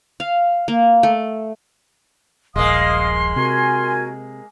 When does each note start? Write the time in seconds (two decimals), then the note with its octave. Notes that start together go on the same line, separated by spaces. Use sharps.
0.20 F5
0.68 A#3
1.03 A3
2.56 D#1 A#1 G#3 A#3 D#5 F5 C6 D#6
3.36 C3 F#4 A#4 G#5